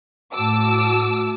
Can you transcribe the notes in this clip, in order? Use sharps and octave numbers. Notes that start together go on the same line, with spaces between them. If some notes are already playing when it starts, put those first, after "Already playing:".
A2 F#4 A5 D6 E6